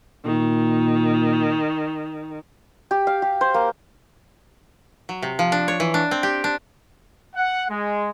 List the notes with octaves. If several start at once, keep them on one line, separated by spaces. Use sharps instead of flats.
A#2 D#3
G4
F5
G4
C5
A#3
F#3
C3
F3
D4
C#5
E3
D4
C4
G4
D4
F#5
G#3